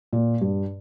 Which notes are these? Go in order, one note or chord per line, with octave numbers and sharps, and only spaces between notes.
A#2
G2